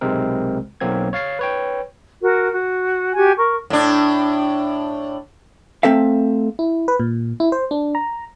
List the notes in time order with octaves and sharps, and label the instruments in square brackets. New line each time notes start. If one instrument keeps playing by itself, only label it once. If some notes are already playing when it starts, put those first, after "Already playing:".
[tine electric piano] B1 C3 G#3 C4 A#4
B1 B2 F#3 A#3 C4 G#6
C#5 F5 A6 C7
B4 C#5 G5
[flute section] F#4 A#4
F#4
F#4 G4 G#5
A#4 C#6
[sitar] A2 D4
[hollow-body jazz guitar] A3 C4 A4 E5 F5
[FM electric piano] E4
B4
A#2
E4
C5
D4
A#5